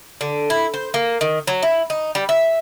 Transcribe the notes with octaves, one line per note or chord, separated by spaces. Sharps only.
D3
E4
C5
A#3
D#3
F#3
E4
D#4
G3
E5